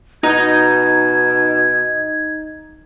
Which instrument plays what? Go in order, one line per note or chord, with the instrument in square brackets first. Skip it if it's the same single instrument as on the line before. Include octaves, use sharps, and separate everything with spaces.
[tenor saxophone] B2 [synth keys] D#4 [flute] G#6